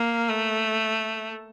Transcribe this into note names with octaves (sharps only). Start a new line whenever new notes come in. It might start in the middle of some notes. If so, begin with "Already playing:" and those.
Already playing: A#3
A3